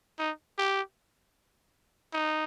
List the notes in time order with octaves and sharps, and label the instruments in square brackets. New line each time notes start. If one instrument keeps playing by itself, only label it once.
[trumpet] D#4
G4
D#4